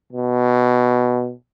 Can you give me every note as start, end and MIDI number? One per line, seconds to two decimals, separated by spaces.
0.12 1.33 47